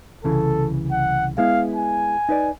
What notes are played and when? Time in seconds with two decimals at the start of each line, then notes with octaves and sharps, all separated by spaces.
0.24 C2 C#3 E3 A4
0.91 F#5
1.38 G#3 B3 E4 F5
1.76 G#5
2.29 D#4 B4 D5